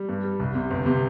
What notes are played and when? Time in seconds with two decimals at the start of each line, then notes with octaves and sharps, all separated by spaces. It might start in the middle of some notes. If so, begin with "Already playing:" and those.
Already playing: G3
0.09 G2
0.24 G3
0.40 C2
0.55 C3
0.71 G1
0.86 C3